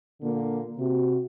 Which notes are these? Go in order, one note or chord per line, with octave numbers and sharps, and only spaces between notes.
A#2 D3 A#3
C3 F#4